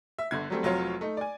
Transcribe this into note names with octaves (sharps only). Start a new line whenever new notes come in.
E5
G1 D3 G#6
F#3 G3 A3 C4
F1 F#3 C4 F4 C#5
A3 D#4
D5 G#5